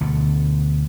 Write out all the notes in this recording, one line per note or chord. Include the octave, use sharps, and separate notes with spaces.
D2 B2 D3